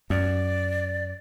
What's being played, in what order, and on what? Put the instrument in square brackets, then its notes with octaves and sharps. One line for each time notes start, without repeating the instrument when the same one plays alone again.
[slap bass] F#2 [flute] D5